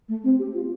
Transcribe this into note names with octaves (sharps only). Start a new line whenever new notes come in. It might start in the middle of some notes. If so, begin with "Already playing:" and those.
A3
C4
G4
F4